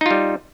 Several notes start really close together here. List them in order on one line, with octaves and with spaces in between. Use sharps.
D#4 F4 G3